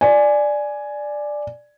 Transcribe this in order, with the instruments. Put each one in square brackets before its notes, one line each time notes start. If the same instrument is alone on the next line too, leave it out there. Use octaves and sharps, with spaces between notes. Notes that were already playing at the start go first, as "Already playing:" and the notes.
[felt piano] D5 G#5